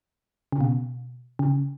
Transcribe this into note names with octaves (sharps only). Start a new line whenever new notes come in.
C#3
B2
C#3